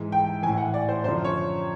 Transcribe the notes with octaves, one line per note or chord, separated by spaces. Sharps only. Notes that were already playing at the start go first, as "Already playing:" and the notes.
Already playing: G#2 E3
G5
A2 E3 G#5
F#5
D5
C5
F#2 D3 F3 C5
C#5